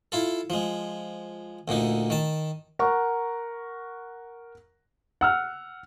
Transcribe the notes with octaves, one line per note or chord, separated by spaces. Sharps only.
E4 F4 A4
F3 G#3
D2 A#2 D3 D#4
D#3 A5
A#4 F#5 A#5 C#6
F#5 E6 F6